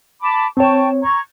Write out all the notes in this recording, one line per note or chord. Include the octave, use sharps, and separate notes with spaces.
A5 B5 D6
C4 C#5 G5 A5 C#6
A#5 C#6 G#6